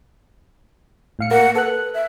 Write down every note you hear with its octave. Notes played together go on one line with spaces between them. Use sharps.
A2 F5 C#7
A#3 F#5
A4 B4 F#6
E5